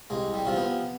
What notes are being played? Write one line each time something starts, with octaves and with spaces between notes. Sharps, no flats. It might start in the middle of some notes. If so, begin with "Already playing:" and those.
C2 G#3
G3
C3 F3
B3